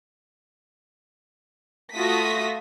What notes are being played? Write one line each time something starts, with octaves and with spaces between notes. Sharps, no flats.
A3 F4 F#4 D#6 A#6 B6